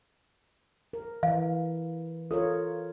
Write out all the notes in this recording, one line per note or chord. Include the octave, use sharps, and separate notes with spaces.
A#4
E3 F5
F4 A4 A#4 C#5